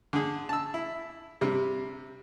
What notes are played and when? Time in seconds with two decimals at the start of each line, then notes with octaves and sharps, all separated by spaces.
0.13 D3 G#4
0.49 A5 E6
0.74 E4
1.41 C3 G3